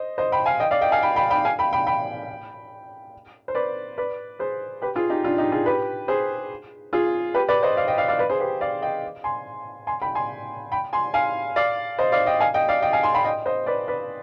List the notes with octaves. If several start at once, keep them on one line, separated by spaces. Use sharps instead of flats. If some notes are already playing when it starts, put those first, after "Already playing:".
Already playing: C5 D#5
C5 D#5
G5 B5
F5 G#5
D#5 G5
D5 F5
D#5 G5
F5 G#5
G5 B5
G5 B5
G5 B5
F5 G#5
G5 B5
G5 B5
G5 B5
C5
B4 D5
B4 D5
G#4 C5
G4 B4
F4 G#4
D#4 G4
D4 F4
D#4 G4
F4 G#4
G4 B4
G#4 C5
F4 G#4
G4 B4
B4 D5
C5 D#5
D5 F5
D#5 G5
D5 F5
D5 F5
B4 D5
G#4 C5
G4 B4
D5 F5
D#5 G5
G#5 C6
G#5 C6
G5 B5
G#5 C6
G5 B5
G#5 C6
F5 G#5
D5 F5
C5 D#5
D5 F5
D#5 G5
F5 G#5
D#5 G5
D5 F5
D#5 G5
F5 G#5
G#5 C6
G5 B5
D#5 G5
C5 D#5
B4 D5
B4 D5